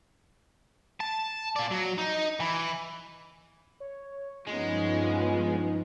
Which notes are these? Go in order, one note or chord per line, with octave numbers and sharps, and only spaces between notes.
A5
A#2 D5
F#3
D#4
E3
C#5
G2 F3 G#3 B3 C#4 D#4 F4